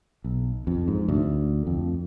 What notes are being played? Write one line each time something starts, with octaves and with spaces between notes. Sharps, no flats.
B1
F2
G#2
D2
F2